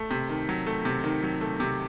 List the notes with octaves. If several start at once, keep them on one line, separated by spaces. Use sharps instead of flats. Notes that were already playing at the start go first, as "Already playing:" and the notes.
Already playing: A3
C3
D#3
F#3
A3
C3
D#3
F#3
A3
C3